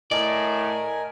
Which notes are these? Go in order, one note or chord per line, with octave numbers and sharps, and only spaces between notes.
A2 A#4 D5 D#5 G#5